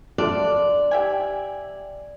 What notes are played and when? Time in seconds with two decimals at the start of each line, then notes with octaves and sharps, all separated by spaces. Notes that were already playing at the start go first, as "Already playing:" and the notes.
0.18 D4 F4 D5
0.91 G4 E5 G#5